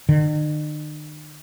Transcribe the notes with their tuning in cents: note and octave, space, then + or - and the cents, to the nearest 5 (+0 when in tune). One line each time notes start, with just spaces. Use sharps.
D#3 -45